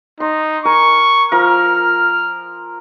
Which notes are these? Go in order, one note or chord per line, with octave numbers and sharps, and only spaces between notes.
D#4 C6
A#4 G#5 C#6
F3 A#4 F6